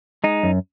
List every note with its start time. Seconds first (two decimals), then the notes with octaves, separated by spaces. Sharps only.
0.24 G#3 D#4
0.43 F#2